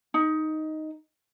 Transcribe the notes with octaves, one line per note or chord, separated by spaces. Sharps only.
D#4